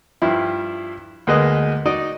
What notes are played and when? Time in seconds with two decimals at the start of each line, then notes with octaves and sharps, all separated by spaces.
0.22 G2 F3 E4
1.27 D2 G#3 A#3 B4 D#5 D#6
1.85 D#4 F#4 D5 D#5 D#6